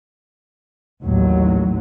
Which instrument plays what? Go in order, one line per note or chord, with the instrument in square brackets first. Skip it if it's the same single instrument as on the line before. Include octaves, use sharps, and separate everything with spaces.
[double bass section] A1 D#2 F#3